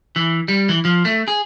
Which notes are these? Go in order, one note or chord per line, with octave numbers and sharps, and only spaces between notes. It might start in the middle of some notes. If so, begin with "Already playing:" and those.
E3
G3
E3
F3
A3
G#4